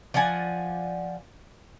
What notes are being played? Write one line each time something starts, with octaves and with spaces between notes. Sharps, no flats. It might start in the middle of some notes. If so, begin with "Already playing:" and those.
F3 D5 F#5 G#5